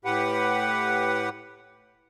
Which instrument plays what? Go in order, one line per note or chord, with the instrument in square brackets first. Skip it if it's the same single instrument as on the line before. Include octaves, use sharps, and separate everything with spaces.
[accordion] A2 G4 B4 F#5